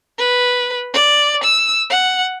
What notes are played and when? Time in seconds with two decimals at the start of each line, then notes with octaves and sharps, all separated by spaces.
0.19 B4
0.93 D5
1.43 E6
1.90 F#5